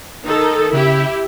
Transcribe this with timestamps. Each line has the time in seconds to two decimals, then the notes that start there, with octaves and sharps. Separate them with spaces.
0.25 D#3 D#4 A4
0.73 C#3 E4 G4 E5